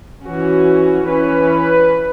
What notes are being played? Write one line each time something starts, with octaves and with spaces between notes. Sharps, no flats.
E3 C#4 F#4
E3 C#4 B4